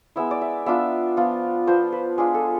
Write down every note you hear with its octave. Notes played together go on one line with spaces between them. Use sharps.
G#3 B3 E4 E5
D5
E5
B3 D4 F4 E5
F3 B3 F4
F3 B3 F4 C5
B4
G#3 D4 F4 G#4
A4